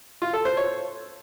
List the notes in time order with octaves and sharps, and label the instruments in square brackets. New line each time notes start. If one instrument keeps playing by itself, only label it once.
[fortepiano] F4
A4
C5
C#5